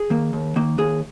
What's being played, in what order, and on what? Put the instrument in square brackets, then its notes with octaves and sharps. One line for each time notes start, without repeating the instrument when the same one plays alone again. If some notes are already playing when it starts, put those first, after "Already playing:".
Already playing: [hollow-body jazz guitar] G#4
D#3 A#3
D#2
D#3 A#3
D#2 G#4